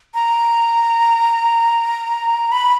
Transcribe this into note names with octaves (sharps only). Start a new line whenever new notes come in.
A#5
B5